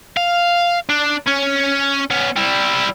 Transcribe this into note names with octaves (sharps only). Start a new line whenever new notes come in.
F5
D4
C#4
B3 C#4
G3 E4